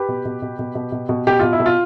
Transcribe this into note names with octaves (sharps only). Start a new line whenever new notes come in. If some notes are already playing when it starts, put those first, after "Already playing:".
Already playing: G4 B4
B2
B2
B2
B2
B2
B2
B2
B2 G4
B2 F4
E4
B2
F4